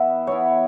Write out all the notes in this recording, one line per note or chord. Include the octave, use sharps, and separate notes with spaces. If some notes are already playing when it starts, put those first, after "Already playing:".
Already playing: E3 B3 E4 E5
E3 B3 E4 C#5